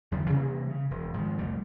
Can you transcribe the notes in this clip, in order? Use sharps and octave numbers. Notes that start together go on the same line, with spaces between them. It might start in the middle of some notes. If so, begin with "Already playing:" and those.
E2 D3 F3 G3
C3 E3 G3 A#3
C#3
E1
G#2 D#3 F3
C2 F2 G3 A3